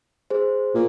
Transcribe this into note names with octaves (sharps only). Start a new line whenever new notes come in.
G#4 C5
A#2